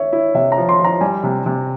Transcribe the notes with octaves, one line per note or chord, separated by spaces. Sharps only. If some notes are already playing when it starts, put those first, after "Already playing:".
Already playing: C#5 E5
E4
C3 E5
A#5
F3
C6
F3 A#5
G3 G#5
C3
C3